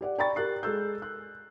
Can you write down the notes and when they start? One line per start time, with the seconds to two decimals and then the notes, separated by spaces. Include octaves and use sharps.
0.01 G4 D5 F#5
0.18 D5 G5 A#5 B5 C#6 A6
0.36 G4 A#4 F#6 C7
0.63 G#3 A4 E6 G6
1.02 F#6